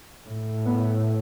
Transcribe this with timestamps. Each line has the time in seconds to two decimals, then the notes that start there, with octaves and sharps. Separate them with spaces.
0.25 A2
0.65 B3